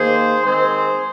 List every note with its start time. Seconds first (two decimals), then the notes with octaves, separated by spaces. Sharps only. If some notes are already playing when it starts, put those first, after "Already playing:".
Already playing: D#3 A#3 G#4 C5
0.44 D#3 G#3 C4 G#4 C5